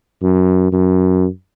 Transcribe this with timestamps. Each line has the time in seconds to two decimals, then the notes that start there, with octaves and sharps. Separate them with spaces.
0.23 F#2
0.73 F#2